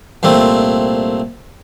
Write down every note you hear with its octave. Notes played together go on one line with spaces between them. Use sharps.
C2 A#2 A3 C4